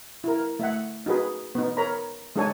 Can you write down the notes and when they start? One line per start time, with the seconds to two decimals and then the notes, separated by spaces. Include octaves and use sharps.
0.24 E4 A#4
0.59 A3 E5 F#5
1.06 D#4 F#4 G#4 B4
1.55 B3 D#4
1.77 A#4 C#5 A#5 B5
2.36 G#3 D4 D#4 A4 C#5 G#5